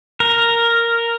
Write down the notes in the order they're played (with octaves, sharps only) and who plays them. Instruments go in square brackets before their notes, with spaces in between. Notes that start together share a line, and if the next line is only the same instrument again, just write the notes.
[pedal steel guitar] A#4